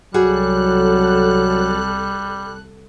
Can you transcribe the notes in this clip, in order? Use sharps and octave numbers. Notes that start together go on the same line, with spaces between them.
C2 F#3 G3 F#4 G#4 A4 F#6